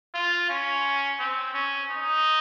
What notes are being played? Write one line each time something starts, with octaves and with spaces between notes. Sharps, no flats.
F4
C#4
C4
C#4
D#4